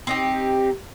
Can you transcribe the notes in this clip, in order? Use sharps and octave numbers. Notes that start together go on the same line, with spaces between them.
C4 D#4 G4